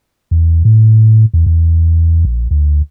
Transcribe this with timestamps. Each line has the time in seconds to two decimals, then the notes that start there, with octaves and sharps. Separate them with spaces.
0.31 E2
0.65 A2
1.33 E2
1.46 E2
2.25 A#1
2.51 D2